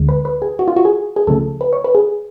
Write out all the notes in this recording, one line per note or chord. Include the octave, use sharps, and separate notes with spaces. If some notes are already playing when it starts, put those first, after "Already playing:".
Already playing: D2 D3 G#3
B4
B4
G#4
F#4
F4
F#4
G#4
G#4
C#2 C#3 F3 A3 A4
B4
C#5
B4
G#4